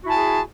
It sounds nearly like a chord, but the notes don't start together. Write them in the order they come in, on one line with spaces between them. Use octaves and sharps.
F#4 E4 A5 G#5 G#4